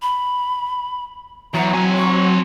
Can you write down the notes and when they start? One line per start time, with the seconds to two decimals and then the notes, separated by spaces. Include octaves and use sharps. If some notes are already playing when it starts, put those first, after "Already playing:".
0.02 B5
1.54 E2 F#3 A#5
1.73 C4 G#5
1.98 C#6